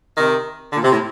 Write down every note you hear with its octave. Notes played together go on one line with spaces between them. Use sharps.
C3 D#3
A#2 D3
C3
A2